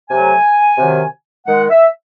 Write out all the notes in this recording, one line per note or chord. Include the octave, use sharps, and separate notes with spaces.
C3 F#3 A3 G#5
C3 D#3 F#3
D#3 G#3 F#5
E5